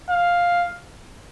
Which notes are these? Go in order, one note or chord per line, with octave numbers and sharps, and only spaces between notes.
F5